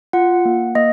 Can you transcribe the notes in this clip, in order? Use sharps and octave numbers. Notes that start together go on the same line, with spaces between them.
F4 F#5
A#3
A#3 D#5